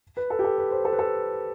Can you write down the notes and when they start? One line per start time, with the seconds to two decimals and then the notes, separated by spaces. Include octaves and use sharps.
0.17 B4
0.30 A4
0.39 G4
0.44 A4
0.58 B4
0.71 C5
0.85 A4
0.93 B4
0.99 A4